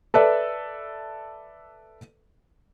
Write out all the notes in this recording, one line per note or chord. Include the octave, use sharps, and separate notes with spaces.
A4 B4 D5 E5